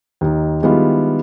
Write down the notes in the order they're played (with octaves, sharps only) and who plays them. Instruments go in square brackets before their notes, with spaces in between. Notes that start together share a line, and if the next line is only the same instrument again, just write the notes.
[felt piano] D#2 D#4
D#3 G3 G#3 B3 E4 F4